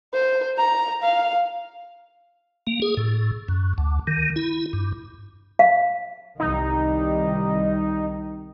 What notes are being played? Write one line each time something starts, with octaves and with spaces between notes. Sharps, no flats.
C5
A#5
F5
A#3
G#4
A2
F#2
D2
D#3
E4
G2
F5
C2 D#3 G3 D#4